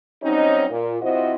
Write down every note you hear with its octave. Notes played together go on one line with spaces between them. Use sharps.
F#3 G3 C4 C#4 D#4
A#2
F3 C4 E4 F#4 C5 D#5